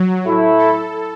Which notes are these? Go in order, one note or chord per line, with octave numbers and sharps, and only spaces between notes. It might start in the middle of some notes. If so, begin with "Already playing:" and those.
Already playing: F#3
A2 A3 E4
A4